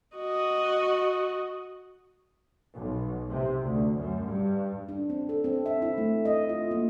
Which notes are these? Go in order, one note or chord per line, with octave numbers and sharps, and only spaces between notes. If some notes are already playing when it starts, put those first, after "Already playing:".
F#4 D#5
B1
C3
D2
F#2
G2
D4
C4
A4
C4
E5
E4
A3
D#5
F4
A#3